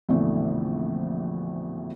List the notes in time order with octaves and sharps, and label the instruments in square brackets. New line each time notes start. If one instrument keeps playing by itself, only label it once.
[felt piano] A#1 F2 B2 D3 E3 A3